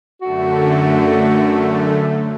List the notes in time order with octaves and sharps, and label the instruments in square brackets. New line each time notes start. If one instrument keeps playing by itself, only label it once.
[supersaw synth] F#2 D3 A3 [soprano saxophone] F#4